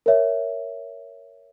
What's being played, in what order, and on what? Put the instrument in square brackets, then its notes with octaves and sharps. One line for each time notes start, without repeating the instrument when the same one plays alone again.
[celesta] A#4 C#5 E5